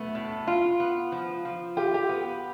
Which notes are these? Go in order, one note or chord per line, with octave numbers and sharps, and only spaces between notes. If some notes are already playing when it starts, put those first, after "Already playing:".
Already playing: A3 B3
A2
F4
B3
F3
F3
F4 G4
G4
B3